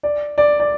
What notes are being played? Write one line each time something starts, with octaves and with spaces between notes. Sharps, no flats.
D5
D5
D5